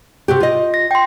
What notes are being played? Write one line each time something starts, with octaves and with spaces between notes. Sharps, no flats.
C3 F#4 G4
F4 D#5
A#6
G5 C6